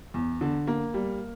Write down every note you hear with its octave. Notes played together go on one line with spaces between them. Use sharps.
E2
D3
A#3
G3